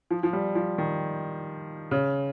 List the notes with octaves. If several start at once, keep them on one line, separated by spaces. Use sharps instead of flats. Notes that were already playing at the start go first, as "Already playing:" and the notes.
F3
F3
G3
F3
D#3
C#3